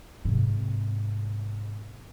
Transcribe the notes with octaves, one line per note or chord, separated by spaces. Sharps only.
G#2 C3